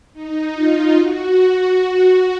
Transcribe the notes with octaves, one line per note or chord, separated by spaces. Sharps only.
D#4
F4
F#4